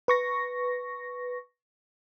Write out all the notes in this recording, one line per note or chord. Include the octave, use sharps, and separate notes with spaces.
B4 C#6 A#6